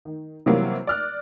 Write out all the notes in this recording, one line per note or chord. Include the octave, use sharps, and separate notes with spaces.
D#3
C3 E3 F#3 G3 A#3
D5 F6 F#6